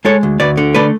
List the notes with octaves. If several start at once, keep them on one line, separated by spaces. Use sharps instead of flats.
G#3 A4 C#5
D2
D2 B4 D5
D3
A3 B4 D5